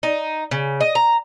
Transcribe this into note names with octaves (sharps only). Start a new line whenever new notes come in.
D#4
C#3
D#5
A#5